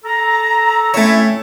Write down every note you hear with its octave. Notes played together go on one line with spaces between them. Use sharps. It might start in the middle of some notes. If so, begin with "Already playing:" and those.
A4 A#5
A3 C4 C#4 E4 C#5